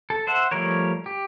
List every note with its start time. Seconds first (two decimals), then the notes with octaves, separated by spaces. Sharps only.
0.10 A4
0.27 C5 E5 F#5
0.51 F3 G3 A3 A#4 C#5
1.06 G4